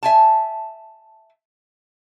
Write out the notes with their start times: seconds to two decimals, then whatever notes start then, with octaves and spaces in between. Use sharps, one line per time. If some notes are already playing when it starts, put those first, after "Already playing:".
0.03 E5 G#5 A5